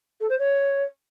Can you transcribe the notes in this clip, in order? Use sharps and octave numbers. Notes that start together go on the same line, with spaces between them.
A4
C5
C#5